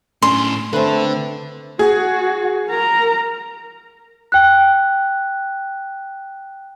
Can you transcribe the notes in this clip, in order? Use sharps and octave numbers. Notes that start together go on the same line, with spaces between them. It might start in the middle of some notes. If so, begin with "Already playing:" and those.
A2 C#4 D4 C6
D3 A3 C4 B4
F#4 G#4
A#4 A#5
G5 F#6